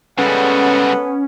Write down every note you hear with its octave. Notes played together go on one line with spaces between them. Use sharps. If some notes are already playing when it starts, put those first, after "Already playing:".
C#3 G3 G#3 B3 C#4 A4 F#5